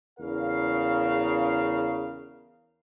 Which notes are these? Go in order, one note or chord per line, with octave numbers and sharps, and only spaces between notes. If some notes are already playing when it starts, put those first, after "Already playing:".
E2 C#3 A#4 F5